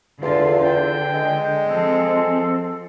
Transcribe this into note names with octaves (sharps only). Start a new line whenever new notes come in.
E2 D3 F4
D3 G5
G#3
F3 C4 A4